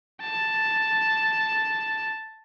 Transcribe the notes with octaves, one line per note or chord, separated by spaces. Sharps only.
A5